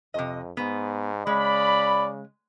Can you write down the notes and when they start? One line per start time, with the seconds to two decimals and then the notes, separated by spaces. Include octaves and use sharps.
0.14 F2 C3 D#5
0.57 G#2 B3
1.27 C#3 G#3 D5 B5